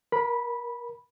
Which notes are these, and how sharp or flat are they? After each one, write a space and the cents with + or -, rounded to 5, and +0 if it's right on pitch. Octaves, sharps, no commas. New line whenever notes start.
A#4 +25 B5 -10